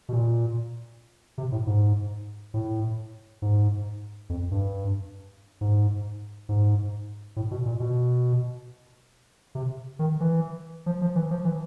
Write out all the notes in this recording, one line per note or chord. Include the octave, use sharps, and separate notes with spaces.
B2
A#2
C3
A2
G#2
A2
G#2
F2
G2
G#2
G#2
A2
B2
A#2
B2
C3
D#3
E3
F3
F3
E3
F3
E3